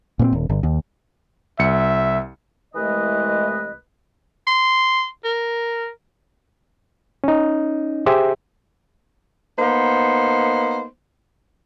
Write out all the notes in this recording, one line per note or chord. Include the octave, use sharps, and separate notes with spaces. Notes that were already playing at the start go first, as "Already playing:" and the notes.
A#2 B3 C4
D#1
G1
D#2
C2 E5 C#7
C2 E3 G#3 A3 B4 D#5
C6
A#4
C#4 D#4
G4 G#4 C5 E5
A#3 B3 D#4 C5